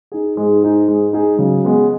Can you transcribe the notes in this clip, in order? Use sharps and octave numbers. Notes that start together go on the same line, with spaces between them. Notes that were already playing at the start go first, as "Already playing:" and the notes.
D#4 G#4
G#2 G#3
D#4 G#4
G#3
D#4 G#4
C#3 F#3
G#3 B3